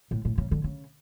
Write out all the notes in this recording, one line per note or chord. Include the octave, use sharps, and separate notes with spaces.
A2
A2
C#3
D3
C#3